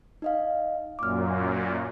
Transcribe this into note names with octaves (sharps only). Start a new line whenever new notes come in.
D#4 D#5 F5
F#2 A#2 D6 F6